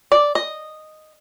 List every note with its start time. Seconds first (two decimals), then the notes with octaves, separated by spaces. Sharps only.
0.12 D5
0.35 D#5